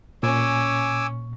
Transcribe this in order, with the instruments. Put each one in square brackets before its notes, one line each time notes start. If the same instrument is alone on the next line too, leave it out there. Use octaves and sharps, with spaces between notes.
[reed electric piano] A#2 [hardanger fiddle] C#4 [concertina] G#5 D6 E6